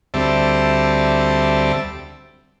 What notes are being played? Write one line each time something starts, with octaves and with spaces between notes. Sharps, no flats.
D2 G3 C4 E5 A5